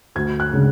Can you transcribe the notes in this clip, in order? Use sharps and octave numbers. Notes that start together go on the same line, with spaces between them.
D2 G#6
F#6
C#3 G#3 D4